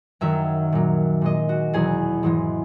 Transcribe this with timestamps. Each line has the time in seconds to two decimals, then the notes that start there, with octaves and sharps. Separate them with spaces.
0.21 F#2 D#3 F#3 E5
0.73 A#2 F#3
1.22 A#2 G#3 D#5
1.49 F#4
1.73 E2 B2 F#3 G#4
2.23 G#2 E3 G#3